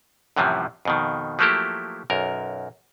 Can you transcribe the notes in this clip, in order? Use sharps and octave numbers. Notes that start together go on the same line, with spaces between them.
F#2 A2 C3 E3 F3 G3
F2 B2 D#3
F3 F#3 A3 A#3 E4 G4
B1 F#2 A#4